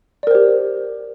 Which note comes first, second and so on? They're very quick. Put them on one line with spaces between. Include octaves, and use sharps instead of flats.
D5 A#4 C5 G4